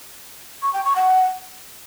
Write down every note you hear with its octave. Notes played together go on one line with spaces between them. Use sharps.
C#6
G5
C#6
F#5